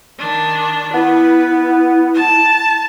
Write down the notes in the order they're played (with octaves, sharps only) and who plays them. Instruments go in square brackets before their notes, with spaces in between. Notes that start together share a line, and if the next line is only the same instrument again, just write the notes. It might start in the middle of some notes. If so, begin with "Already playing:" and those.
[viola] D#3 D4
[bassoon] B3 [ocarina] E4 [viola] B4
[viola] A5